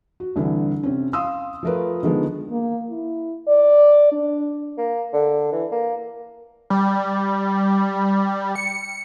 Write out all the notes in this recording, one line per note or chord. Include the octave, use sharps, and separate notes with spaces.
F#4
C2 D3 E3
C3 C4 C#4
F5 C6 D#6 E6
F3 A3 F4 A#4 B4
D3 D#3 F3 G#3 B3
A#3
E4
D5
D4
A#3
D3
E3
A#3
G3
C#7